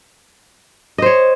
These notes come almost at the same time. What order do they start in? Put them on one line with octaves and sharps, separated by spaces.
D#5 C5 C#5